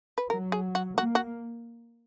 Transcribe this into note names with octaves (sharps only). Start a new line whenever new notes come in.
B4
F#3 A#4
G#4
F#4
A#3 F#4
F#4